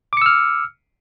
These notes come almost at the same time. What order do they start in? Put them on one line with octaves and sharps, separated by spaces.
D6 C#7 E6 F6